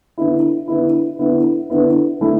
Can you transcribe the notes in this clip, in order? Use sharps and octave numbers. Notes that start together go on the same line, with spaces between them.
D3 B3 E4
D3 B3 E4
D3 B3 E4
D3 B3 E4
D3 A3 E4